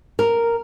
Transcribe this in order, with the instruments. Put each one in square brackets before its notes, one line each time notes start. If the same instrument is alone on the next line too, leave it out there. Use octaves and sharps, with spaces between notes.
[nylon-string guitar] A#4